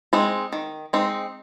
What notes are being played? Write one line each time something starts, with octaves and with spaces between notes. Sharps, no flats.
G#3 C4 D#4
D#3
G#3 C4 D#4